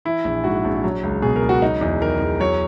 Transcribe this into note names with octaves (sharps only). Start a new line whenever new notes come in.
E3 E4
A#1
G#2 F#4
A#1
F#3
C#2
B2 G#4
A#4
C#2
F#4
F#3 D#4
E2
D#3 A#4
E2
F#3 C#5